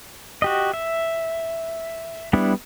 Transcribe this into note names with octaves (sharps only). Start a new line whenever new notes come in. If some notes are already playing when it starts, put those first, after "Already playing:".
F#4 G4 D#5
E5
G3 B3 D4 E4